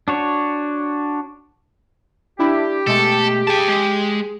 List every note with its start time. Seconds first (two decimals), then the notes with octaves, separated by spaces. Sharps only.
0.08 D4 F#4 C#5
2.39 D4 E4 G4
2.87 B2 G#3 A3 A4
3.47 G#4 G5 A5
3.68 G#3